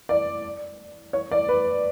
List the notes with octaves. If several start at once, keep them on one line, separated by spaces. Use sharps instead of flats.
D5
C#5
D5
B4